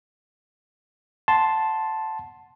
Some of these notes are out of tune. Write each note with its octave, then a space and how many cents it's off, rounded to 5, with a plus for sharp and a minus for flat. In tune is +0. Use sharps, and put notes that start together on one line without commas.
F#5 +0 A5 -5 C6 +0